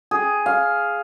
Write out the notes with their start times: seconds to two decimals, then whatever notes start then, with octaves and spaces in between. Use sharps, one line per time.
0.11 G#4
0.46 F5